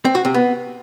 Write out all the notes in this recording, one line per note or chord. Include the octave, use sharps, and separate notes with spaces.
C4
F#4
C3
B3